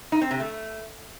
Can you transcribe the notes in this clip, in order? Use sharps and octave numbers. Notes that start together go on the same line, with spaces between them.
D#4
C4
C3
A3